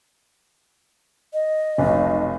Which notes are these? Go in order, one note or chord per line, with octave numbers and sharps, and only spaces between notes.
D#5
F1 B1